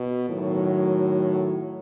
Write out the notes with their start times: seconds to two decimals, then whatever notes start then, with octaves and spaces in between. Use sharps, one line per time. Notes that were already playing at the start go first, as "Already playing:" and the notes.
Already playing: B2
0.29 A2 D#3 F#3